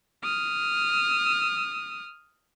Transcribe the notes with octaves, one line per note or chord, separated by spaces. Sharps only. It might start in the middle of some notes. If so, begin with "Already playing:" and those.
D#6 F6